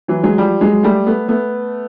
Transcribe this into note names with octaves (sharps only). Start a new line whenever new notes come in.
E3 F#3
F#3 G#3
F3 G3
F#3 G#3
G3 A3
A3 B3
A3 B3